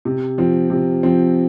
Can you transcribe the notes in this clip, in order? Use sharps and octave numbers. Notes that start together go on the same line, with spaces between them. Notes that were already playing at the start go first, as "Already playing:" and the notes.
C3
F3 C4
C3
F3 C4